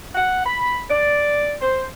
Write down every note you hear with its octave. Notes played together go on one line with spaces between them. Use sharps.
F#5
B5
D5
C5